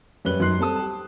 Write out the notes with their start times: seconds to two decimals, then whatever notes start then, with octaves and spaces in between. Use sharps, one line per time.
0.25 F#2 G3 C#4 B4 F#6 G7
0.40 F#2 F#3 D#4 C6 F#6 C7
0.59 G3 C4 A4 A5 D#6
0.76 G4 A5